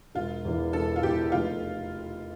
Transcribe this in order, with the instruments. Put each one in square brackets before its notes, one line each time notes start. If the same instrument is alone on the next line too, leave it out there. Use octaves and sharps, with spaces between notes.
[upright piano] E1 [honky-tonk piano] F4
[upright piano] E2 E3
[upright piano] E1 [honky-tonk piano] A4
[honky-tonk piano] F4
[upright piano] E2 E3 [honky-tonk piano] G4
[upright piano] F1 [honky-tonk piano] F4